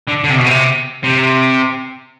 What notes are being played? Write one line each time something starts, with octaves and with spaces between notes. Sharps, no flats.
D3
D3
C3
B2
C3
C3